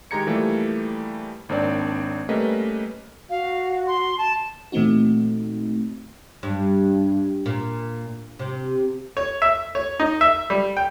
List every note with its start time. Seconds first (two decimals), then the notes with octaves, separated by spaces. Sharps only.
0.11 D#3 G#3 G4 A#5 G#6 C#7
0.27 E3 F3 G3 A3 A#3
1.49 G#1 A#3 C4 D4 C#5 D5
2.29 G3 A3 A#3 C#4 B4 D#5
3.30 F#4 F5
3.87 C6
4.18 A5
4.72 A#2 E3 A3 C4 D#4 F#4
6.43 G2
7.46 A#2
8.39 C3
9.17 C#5
9.42 E5
9.75 C#5
10.00 D#4
10.21 E5
10.50 G3
10.77 G5